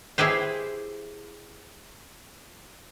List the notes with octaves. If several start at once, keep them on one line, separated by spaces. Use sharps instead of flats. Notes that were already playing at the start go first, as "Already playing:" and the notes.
E4 G4 G#4 B4 C5